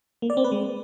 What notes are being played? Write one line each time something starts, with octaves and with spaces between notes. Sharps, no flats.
A#3
D5
C4
B4
G#3